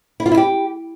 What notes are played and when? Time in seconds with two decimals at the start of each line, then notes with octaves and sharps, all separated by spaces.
0.20 E4
0.26 F4
0.32 E4
0.37 G4